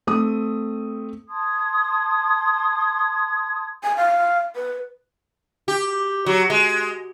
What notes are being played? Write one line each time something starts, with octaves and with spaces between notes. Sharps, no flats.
A3 C4 D#6
A5 C6 D#6 G#6
G#5
F5
B4
G4
F#3
G#3